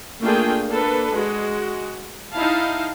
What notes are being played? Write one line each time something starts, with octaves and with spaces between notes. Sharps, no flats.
A3 A#3 D4 F4 G#4 G5
A#3 D4 A4 B4
G#3 F#4
D#4 E4 F5 A5